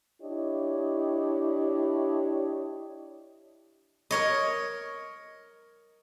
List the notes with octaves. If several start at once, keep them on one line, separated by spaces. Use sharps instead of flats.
D4 E4 G4 C#5 D#5
A#4 C#5 D#5